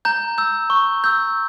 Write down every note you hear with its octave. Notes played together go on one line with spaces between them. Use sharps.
A#5 G6
E6 G6
C#6
E6 G6